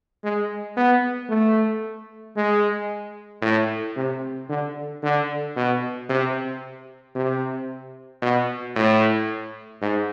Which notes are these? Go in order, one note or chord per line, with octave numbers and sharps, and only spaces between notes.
G#3
B3
A3
G#3
A2
C3
D3
D3
B2
C3
C3
B2
A2
G#2